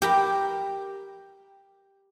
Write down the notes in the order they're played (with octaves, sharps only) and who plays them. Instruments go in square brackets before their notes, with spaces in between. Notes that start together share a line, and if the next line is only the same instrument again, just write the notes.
[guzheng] G4 A#4 B5